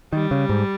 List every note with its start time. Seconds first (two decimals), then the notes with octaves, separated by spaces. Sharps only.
0.13 D#3 G3
0.31 C#3
0.49 G#2